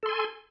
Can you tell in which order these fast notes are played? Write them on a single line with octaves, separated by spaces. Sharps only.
A4 C6 G#5